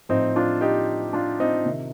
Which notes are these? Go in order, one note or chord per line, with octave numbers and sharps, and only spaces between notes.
A2 F3 C4 D#4
D4 F4
D#4 G4
D4 F4
C4 D#4
C3 D#3